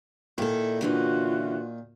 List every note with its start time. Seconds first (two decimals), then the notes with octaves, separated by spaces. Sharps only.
0.38 A#2 D#3 E4 A4
0.81 D3 E3 C#4 F4 F#4